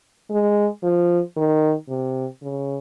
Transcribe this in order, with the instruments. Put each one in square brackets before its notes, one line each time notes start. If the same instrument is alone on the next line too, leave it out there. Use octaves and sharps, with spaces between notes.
[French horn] G#3
F3
D#3
C3
C#3